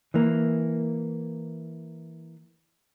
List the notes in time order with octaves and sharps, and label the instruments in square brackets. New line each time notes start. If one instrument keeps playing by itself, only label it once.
[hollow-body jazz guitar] E3 A#3